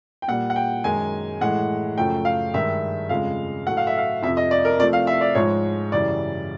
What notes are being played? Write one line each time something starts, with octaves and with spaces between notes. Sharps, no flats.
G5
A#2 G3 F#5
F#5
G5
F#2 D#3 G#3 G#5
A2 E3 G#3 F#5
F#2 C#3 F3 A3 G5
F5
G2 D#3 G#3 E5
F2 C#3 F3 G#3 F5
A2 F#3 A3 F#5
F5
E5
F5
F2 C3 F3 E5
D#5
D5
A#4
C3 F3 A3 D5
F5
E5
D5
G#2 F3 G#3 C#5
F#2 C#3 E3 G3 D5